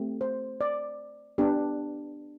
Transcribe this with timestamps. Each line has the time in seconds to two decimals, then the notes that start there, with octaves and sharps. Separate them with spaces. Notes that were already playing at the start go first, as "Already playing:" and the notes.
Already playing: A3 C4 G4
0.21 C5
0.61 D5
1.38 B3 D4 G4